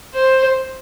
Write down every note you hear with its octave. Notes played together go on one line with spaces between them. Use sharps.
C5